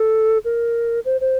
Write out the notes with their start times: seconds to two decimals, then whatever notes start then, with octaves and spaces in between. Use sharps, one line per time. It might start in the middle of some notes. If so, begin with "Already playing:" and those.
Already playing: A4
0.45 A#4
1.05 C5
1.21 C5